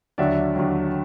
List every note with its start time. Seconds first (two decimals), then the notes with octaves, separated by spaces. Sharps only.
0.18 D#2 D3 F#3 D5 E5
0.56 D#2 D3 F#3